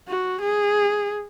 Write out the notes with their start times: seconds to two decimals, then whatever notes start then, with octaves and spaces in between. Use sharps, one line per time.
0.09 F#4
0.42 G#4